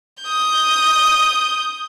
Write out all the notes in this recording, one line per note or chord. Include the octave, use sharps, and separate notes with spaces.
D#6 G6